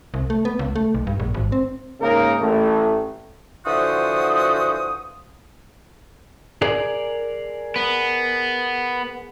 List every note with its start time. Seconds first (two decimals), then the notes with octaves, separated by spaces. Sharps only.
0.14 C2
0.30 A3
0.45 B3
0.59 C#2
0.76 A3
0.94 B1
1.07 G2
1.20 A#1
1.34 G#1
1.52 C4
2.01 G#2 C#3 A#3 D#4 A#4
2.41 A1 A3
3.66 D3 E3 F3 F#4 C5 D#6
6.62 G#4 A#4 D5
7.76 B3